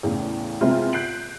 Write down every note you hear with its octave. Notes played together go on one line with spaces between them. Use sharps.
E2 A2 C#3
C3 G#3 B3 C4 E4 F4
F#6 G6 B6 C7 D7 F#7